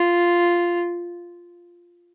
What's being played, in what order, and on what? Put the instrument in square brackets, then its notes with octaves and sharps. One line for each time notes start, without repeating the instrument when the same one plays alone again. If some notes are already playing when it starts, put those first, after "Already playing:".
Already playing: [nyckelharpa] F4